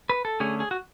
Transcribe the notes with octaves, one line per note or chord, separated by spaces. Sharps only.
B4
A4
D3 A3 C#4 G#4
G#4
F#4